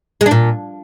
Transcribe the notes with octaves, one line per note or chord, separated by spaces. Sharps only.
G#3
D4
A#2